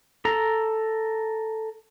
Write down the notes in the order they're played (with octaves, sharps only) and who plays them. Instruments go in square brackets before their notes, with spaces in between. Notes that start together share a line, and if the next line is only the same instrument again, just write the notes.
[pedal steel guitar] A4 A#5